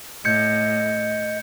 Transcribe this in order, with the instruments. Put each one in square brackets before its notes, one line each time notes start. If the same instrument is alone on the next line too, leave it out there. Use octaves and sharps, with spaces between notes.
[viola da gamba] A2 [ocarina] D#5 [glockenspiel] G6 G#6 C#7